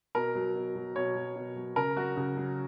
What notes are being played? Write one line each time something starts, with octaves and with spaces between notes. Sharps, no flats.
B2 A#4
F#3
B2
F#3
B2 C#5
F#3
B2
F#3
C#3 A#4
F#3 F#4
C#3
F#3